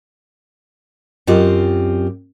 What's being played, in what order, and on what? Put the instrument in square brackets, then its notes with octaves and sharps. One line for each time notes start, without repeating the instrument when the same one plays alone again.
[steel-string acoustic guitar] F#2 C4 F4 G4 D#5